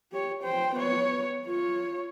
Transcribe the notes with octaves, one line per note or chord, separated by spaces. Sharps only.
G4 C#5
C5 G5
B3 C#5
F4 C#5